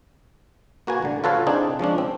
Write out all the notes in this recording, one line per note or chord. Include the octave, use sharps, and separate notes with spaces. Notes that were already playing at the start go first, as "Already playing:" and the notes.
A#3 F#4 B4 G#5
A1 D3
F4 F#4 A4 B4 C#5 F5
E3 C4 D4 D#4 G#4
F3 G#3 C#4 D4
C4